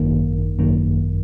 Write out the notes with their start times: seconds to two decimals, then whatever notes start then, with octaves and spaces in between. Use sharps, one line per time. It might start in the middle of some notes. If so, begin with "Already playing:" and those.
Already playing: G#1 F#2 D#3 A#3
0.59 G#1 F#2 D#3 A#3